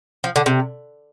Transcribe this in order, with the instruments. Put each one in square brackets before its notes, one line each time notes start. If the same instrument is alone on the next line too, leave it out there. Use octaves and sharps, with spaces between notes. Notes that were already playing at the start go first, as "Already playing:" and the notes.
[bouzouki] F3
D3
C3